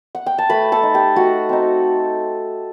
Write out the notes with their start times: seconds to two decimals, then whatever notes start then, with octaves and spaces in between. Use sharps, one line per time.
0.15 F#5
0.26 G5
0.38 A5
0.49 A3 B4 B5
0.72 A4 A5
0.83 D#4
0.94 G4 G5
1.16 A3 F#4 F#5
1.49 C4 D#4